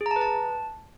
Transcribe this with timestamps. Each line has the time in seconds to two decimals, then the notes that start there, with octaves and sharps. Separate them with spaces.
0.01 G#4
0.06 A#5
0.11 A5
0.16 B4
0.21 A5